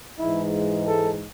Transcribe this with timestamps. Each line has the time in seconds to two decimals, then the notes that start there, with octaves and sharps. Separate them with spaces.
0.19 G#2 E3 G#3 D#4 E4
0.87 A4